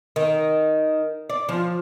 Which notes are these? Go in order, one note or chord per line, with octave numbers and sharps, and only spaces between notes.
D#3
D5
F3